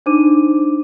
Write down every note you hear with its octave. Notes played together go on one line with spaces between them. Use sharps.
D4 D#4 C5 D6 D#7